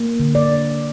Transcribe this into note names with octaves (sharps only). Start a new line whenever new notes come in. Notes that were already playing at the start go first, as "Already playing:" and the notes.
Already playing: A#3
D3
D5